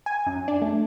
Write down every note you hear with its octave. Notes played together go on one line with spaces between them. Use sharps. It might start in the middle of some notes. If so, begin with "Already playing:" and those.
G#5
F#2
D4
A3